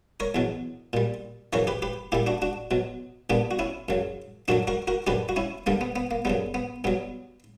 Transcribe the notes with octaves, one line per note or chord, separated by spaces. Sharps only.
A#4 C#5
E2 B2 F#3
A#2 G3
F#2 C#3 E3 A#4 C#5
G4 B4
G4 B4
A#2 G3 E4 G4
D4 F#4
D4 F#4
B2 F#3
A#2 G3 B3 D4
F#4
C#4 E4
F#2 C#3 F#3
F#2 D3 F#3 D4 F#4
F#4 A#4
F#4 A#4
F#2 D3 F#3 G4 B4
F#4
C#4 E4
G2 D3 G3 A#3
B3
B3
A#3
F#2 C#3 G3 B3
B3
G2 F#3 B3